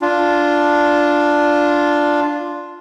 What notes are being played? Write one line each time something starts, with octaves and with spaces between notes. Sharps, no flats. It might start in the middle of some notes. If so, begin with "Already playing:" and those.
D4 F4